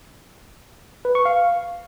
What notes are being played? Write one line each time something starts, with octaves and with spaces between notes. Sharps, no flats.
B4
C#6
F5